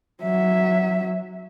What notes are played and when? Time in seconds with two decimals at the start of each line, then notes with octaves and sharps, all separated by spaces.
0.22 F#3 E5